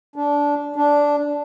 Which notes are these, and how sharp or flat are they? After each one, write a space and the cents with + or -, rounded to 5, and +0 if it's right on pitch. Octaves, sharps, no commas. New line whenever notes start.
D4 -20
D4 -10